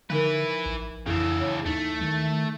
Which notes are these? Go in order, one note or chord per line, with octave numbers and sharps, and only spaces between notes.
D3 F3 D#4 E4 A#4 B4
A1
F2 C#3 E3 E4 A4
C#5
D#2 A3 D#4
D#3